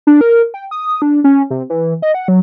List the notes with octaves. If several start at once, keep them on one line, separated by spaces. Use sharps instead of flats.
D4
A#4
G5
D#6
D4
C#4
C3
E3
D#5
F#5
F#3